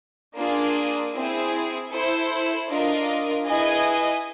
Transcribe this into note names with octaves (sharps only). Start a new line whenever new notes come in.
A#3 D4 F4 G#4
C4 E4 G#4
E4 A4 C5
D4 F4 A#4 D#5
E4 G#4 B4 D#5 G#5